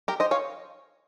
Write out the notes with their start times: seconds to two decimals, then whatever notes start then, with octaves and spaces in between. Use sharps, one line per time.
0.08 G4 A#4
0.20 C5 D#5
0.31 C#5 F5